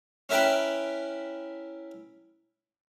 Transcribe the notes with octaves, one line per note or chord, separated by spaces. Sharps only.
C#4 E4 A#4 B4 G5 B5